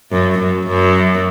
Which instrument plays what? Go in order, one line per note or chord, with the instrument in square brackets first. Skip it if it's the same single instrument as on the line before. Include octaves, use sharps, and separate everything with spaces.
[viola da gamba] F#2
F#2
F#2